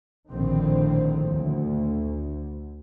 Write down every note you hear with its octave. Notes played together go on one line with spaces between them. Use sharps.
A#1 A2 D3 D#3 C4
D2